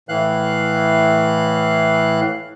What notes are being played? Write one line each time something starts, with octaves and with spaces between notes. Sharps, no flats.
A2 E3 F5 F#6